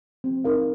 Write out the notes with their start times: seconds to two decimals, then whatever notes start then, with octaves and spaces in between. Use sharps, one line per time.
0.24 C4
0.44 D#4 A#4 F5